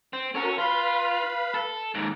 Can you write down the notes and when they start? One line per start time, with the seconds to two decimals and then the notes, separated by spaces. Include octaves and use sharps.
0.13 C4
0.35 C#4 F#4 A4 A#4
0.58 F4 B4 F5 B5
1.54 A4
1.95 D#2 G#2